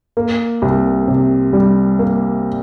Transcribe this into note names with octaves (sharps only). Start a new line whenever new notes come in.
A#3
C2
C3
G3
A#3